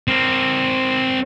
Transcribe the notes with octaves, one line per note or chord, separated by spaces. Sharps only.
C4 A#4